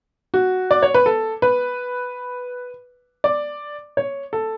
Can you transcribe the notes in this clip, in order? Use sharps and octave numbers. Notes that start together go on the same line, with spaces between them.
F#4
D5
C#5
B4
A4
B4
D5
C#5
A4